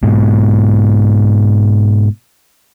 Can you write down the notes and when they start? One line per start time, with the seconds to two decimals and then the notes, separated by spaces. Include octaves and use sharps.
0.03 G#2 B2